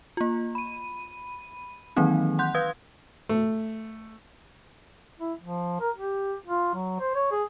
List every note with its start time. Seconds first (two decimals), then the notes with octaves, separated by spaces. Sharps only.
0.17 A#3 F4
0.55 B5 D#7
1.96 D#3 E3 F#3 A#3 C4 D#4
2.39 F#5 C6 F#6 G6
2.55 B4 F5 D#6 G#6
3.29 A3
5.20 E4
5.41 F3
5.81 A#4
5.96 G4
6.47 F4
6.74 F#3
7.00 C5
7.15 C#5
7.31 G#4